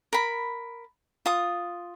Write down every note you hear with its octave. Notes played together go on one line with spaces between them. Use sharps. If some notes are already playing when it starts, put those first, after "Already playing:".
A#4 B5
F4 D#6